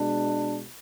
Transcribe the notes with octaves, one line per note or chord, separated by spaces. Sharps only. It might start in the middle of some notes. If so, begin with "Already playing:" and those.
Already playing: B2 G#3 D4